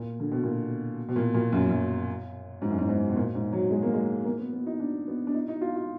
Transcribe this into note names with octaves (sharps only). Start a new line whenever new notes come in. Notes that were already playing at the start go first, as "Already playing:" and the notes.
Already playing: A#2
D3
B2
A#2
B2
A#2
A#2
F#2
F#2
G#2
F#2
G#2
G#2
B2
A#2
G#2
F#3
G#3
A#3
G#3
A#3
B3
B3
D#4
D4
B3
D4
D#4
D#4
F4
F4